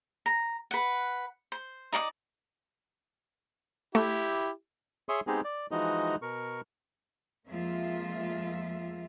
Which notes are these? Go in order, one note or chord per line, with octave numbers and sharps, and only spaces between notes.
A#5
B4 F#5
C5
D#4 D5 F#5 D6
A3 E4 G4
G#4 C#5 E5 C6 C#6 D#6
G#3 B3 C4 D#4 G4 G#4
D5
E3 F3 G#3 D#4 F#4 D#5
B2 A#4 C#6
F2 F3 G#3 A#3 F4 E5